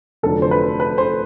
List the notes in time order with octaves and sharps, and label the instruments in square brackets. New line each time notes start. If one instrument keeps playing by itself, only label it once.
[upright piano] F1 F2 D3 F#3 A4
C5
B4
B4
C5